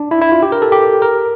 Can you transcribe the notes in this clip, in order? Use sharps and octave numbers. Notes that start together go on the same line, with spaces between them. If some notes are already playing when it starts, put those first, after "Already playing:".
Already playing: D4
E4
E4
F4
G4
A#4
A4
G4
A#4